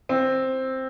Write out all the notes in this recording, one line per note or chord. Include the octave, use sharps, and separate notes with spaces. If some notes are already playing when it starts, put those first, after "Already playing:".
C4